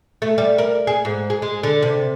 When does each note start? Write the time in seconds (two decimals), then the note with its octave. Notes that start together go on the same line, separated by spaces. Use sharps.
0.22 A3
0.38 G3
0.58 A#4
0.87 G#4
1.05 G#2
1.30 G#4
1.42 G#3
1.63 D3
1.83 C3